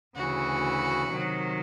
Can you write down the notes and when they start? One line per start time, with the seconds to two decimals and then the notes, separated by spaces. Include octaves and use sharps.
0.16 D2 C#3 E3 F#4
1.10 C3 D#3 F#3